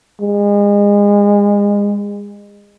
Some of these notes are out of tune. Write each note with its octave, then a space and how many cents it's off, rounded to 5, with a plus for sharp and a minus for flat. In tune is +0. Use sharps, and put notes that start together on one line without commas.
G#3 -30